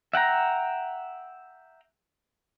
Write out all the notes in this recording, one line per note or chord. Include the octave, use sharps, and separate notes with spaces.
E5 F#5 G5 A#5